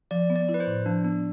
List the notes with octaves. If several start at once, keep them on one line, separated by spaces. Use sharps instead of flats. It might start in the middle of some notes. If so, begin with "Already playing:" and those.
F3 D5
B3
D5
E4
B4
C5
A2
F3 D4
B3 D4